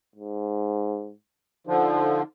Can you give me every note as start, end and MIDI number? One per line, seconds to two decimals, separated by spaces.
0.16 1.13 44
1.67 2.22 50
1.67 2.22 53
1.67 2.24 63